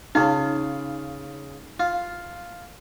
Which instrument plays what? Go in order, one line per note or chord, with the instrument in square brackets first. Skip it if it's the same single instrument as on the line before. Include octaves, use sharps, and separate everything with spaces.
[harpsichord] C#3 F4 [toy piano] D#4
[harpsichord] F4